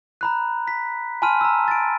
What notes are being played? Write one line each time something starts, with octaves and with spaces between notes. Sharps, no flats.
A#5 B5 F#6
B6
G#5 A5 B5 C6 F6 D#7
A#5 E6
A6 D7